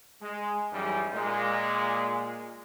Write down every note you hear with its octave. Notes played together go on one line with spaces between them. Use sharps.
G#3
F#2 E3 G3 G#3 D#4
A#2 G#3